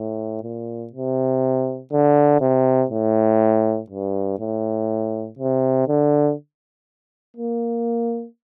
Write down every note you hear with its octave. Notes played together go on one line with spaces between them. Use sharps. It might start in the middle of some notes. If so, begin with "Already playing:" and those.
Already playing: A2
A#2
C3
D3
C3
A2
G2
A2
C3
D3
A#3